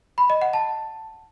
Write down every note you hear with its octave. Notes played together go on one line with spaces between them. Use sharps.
B5
D#5
F#5
A5